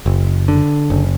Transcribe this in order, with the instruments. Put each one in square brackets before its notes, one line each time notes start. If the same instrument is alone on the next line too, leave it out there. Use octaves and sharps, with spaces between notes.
[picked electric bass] F#1
D3
F#1